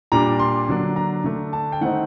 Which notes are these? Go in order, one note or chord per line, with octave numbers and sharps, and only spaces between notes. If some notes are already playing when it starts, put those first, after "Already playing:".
A#2 G3 D4 A#5
C6
D3 F#3 A#3 D4
A#5
D3 A3 D4
A5
G5
D#3 A3 C4 D#4 F#5